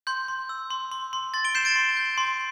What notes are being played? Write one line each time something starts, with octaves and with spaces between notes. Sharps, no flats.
C6 G6
C6
E6
C6
C6
C6
C6 A6
D7 G7
G6 C7 E7
A6 D7
C6
G6
C6